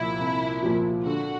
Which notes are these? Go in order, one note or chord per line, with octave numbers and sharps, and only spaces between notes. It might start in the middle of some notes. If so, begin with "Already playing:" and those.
Already playing: C2 A#2 F3 E4
C2
A#2 F3
D3 F#4